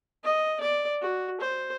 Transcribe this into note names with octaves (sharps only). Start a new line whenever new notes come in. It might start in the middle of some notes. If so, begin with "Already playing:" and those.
D#5
D5
F#4
C5